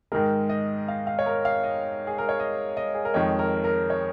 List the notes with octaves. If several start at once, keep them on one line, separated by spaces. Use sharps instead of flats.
G#2 D#3 G#3 A#4
D#5
F5
F5
C#5
A#4
F5
D#5
G#4
A#4
C#5
D#5
D#5
G#4
A#4
F2 D#3 G#3 C#5
A#4
A#4
C#5